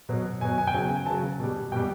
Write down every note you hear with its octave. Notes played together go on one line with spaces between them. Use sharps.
B2 F#3
B2 F#3 G#5
G#5
G5
C#3 F#3 G#5
G#5
C#3 F#3 A5
B2 G3
B2 G3 G5